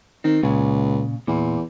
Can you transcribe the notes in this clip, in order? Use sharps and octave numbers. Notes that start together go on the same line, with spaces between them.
D#3 C4
C#2 A#2 C#3
E2 A#2